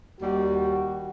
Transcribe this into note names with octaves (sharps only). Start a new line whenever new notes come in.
D#2 G3 F#4